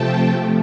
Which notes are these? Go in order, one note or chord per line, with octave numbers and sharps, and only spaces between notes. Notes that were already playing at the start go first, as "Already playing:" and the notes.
Already playing: C3 F3 A3 G5 A5